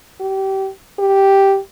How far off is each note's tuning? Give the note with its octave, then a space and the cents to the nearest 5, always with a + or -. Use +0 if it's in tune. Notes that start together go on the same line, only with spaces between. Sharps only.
G4 -25
G4 -5